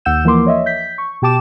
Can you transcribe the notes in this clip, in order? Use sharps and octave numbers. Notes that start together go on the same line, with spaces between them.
D#2 F#5 E6 G6 E7
E3 F3 A#3 A#4 C6 D6
C#5 D#5 E5
G6 B6
C#6
B2 G4 G5 A5 D6 E7